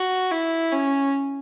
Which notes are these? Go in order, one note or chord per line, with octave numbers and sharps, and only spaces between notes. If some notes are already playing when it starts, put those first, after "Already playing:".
Already playing: F#4
E4
C#4